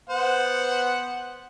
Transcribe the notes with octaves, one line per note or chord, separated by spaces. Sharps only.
B3 C5 F#5